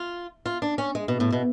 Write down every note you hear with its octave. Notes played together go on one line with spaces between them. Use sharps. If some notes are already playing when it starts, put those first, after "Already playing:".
Already playing: F4
F4
D4
C#4
G#3
B2
A2
B2